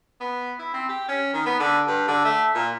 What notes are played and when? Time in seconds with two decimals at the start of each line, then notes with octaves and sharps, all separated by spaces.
0.20 B3
0.59 E4
0.73 C4
0.89 G4
1.08 C#4
1.33 D#3
1.46 B3
1.60 D3
1.87 G2
2.08 D3
2.25 A3
2.55 A#2